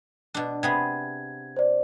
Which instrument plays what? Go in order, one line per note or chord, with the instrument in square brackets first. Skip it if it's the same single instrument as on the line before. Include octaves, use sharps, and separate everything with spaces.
[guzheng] B2 D4
[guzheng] C3 B3 G#4 [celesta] G#6
[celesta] C5 D5